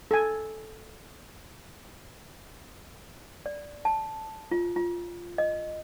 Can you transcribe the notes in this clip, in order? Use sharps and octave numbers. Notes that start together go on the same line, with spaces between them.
A4 G#5
D5
A5
F4
F4
D#5